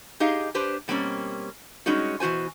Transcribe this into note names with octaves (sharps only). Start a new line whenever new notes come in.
D#4 G4 G#4 D#5 F5
D4 G4 B4 C5
B2 G3 A#3 C4 C#4
G3 G#3 C#4 D#4 F#4
B2 E3 F#4 C5 G#5